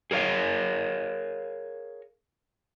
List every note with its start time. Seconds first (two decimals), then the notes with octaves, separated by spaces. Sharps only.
0.11 G#4 A#4 C#5 F5